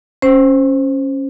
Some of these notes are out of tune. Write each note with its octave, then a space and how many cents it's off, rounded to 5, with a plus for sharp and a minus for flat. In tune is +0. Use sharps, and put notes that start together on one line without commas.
C#4 -15 C5 +0